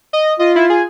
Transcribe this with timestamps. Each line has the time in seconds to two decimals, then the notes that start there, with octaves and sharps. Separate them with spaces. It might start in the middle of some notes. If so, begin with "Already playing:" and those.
0.13 D#5
0.39 F4 D#5
0.56 E4
0.70 G#4